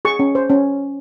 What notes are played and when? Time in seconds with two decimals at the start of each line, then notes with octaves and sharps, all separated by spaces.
0.05 G#4 C#6
0.19 C#4
0.35 C5
0.50 C#4